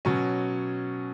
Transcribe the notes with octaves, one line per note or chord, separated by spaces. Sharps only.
B2 F#3 C#4